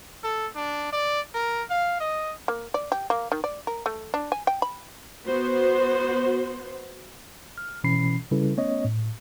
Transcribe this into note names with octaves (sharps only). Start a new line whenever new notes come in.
A4
D4
D5
A#4
F5
D#5
A#3
D5
G4
A#3
D#3
D5
A#4
A3
D4
G#5
G5
B5
B3 F#4 C5
F6
B2 E3 C#4 B5 C7
C#3 G3 C#4 E4 A4 B4
A3 B3 C#4 C#5 D#5
A2